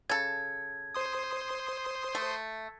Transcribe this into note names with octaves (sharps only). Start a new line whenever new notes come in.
C#3 A4 G#6
C5 C6 D#6
A3